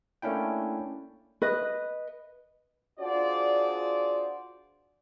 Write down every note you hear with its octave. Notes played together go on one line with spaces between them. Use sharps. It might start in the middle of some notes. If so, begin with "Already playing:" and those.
A3 A#3 C#4 D4 E4 G5
B4 D#5
D4 F4 F#4 G#4 C5 D5